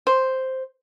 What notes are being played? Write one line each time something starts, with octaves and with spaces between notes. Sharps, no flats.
C5